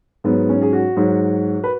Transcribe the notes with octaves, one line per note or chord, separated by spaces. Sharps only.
G#2 F#3 B3
C#4
G#4
F#4
G#2 F#3
B4